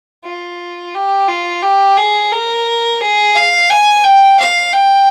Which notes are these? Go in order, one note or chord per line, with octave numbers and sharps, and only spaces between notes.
F4
G4
F4
G4
G#4
A#4
G#4
F5
G#5
G5
F5
G5